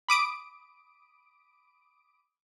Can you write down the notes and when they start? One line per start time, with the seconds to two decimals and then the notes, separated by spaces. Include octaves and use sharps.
0.09 B5 D6 D#6 D7